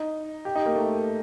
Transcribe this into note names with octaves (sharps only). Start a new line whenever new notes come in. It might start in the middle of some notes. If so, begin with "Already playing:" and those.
Already playing: D#4
G4
D#4
A#3
A3